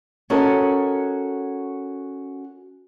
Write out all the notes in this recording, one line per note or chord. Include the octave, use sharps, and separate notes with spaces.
C#4 F#4 A4 A#4 C#5 D#5